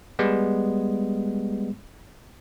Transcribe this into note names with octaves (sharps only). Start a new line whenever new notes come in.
G3 G#3 B3